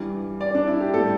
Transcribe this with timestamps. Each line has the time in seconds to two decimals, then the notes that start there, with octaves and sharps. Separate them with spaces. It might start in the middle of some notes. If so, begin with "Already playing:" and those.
Already playing: G2 E3 G3
0.41 D5
0.55 D4
0.67 E4
0.81 G4
0.94 A2 G3 A4